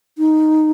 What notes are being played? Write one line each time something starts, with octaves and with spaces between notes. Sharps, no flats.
D#4